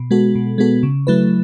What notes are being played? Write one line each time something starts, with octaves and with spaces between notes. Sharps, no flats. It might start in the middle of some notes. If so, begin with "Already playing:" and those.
Already playing: B2
G#3 B3 F#4 A4
B2
G#3 B3 F#4 A4
C#3
F#3 A3 E4 B4